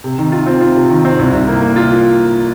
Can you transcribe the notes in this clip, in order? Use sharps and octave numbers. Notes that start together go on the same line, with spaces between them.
C3
D#3
F4
C4
F4
C3
D#3
C4
C2
C2
A#3
A#3
F4